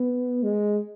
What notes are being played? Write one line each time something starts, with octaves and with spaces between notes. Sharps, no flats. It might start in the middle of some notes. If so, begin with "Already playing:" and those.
Already playing: B3
G#3